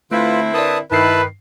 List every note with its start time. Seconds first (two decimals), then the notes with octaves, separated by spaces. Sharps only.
0.12 D3 A3 C4 E4 F4 B4
0.54 A#4 B4 D5 A5 D#6
0.92 G2 D#3 E4 B4 A5 C7